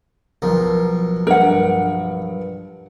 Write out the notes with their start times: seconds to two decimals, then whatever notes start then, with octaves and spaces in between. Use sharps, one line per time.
0.42 B1 F3 A#4
1.27 G2 A#4 F#5